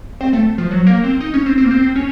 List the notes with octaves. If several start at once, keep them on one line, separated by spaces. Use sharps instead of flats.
C4
A3
F3
F#3
A#3
C4
D#4
C#4
C4
C4
A#3
C4
C#4